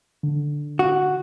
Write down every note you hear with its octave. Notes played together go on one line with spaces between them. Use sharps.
D3
F#4